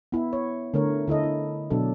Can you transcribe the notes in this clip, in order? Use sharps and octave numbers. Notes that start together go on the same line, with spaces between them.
B3 E4
C#5
D3 A3 A#4 C#5
D3 E4 A4 D#5
E4
B2 F#3 D4 A4